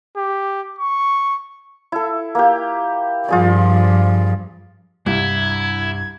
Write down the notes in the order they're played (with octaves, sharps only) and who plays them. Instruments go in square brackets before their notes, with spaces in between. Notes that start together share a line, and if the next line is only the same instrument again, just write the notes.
[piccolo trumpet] G4
C#6
[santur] E4 A4
A#3 G4
[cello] G2 F3 [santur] F4 G#4 D5
[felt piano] C2 [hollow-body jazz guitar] G2 [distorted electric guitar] E4 [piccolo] G#6